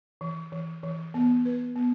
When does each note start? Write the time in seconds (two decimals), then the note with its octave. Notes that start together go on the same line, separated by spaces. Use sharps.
0.21 E3
0.52 E3
0.83 E3
1.14 B3
1.45 B4
1.76 B3